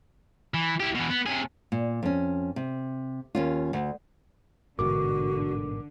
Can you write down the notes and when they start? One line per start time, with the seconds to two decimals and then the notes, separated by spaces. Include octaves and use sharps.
0.54 E3
0.80 E4 G4
0.95 B2 E3
1.10 B3
1.26 C3 G#4
1.72 A#2
2.03 F2 C#4
2.56 C3
3.35 D#2 C#4 F4
3.73 D2
4.79 A1 G#2 B2 D3 F#4 A#4 D6